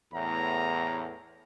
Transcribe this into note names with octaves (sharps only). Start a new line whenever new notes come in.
E2 A2 A#5